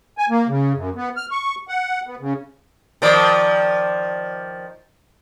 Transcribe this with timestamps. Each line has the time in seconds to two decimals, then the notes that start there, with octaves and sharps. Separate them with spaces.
0.18 G#5
0.30 A#3
0.48 C#3
0.75 F#2
0.96 B3
1.16 F6
1.31 C#6
1.68 F#5
2.07 B3
2.20 C#3
3.02 D#3 F3 D5